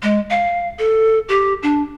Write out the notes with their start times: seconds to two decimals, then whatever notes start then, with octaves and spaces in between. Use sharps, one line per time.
0.03 G#3
0.30 F5
0.79 A4
1.29 G4
1.63 D4